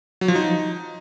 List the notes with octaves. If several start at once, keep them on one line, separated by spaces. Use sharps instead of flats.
F#3
F3
D#4